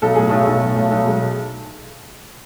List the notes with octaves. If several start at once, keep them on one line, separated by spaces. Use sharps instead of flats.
B1 A4
A2 G#4
B1 A3 A4
B1
A2
B1
B1
G#3